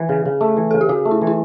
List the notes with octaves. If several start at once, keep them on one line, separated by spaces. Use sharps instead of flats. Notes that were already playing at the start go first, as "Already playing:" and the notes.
Already playing: E3
C#3
C#3
A3
E3
C#3 A4
G4
C#3 F#4
A3
E4
E3
E4